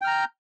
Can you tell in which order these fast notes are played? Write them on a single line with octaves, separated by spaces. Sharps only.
G5 F6 A#5 G6